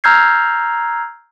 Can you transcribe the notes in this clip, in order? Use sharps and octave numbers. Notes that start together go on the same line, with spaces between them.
A#5 E6 F6 G6 G#6 C7